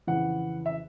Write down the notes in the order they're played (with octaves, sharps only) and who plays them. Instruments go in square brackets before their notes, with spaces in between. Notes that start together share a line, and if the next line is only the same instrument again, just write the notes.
[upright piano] F2 C#3 E3 F#5
E5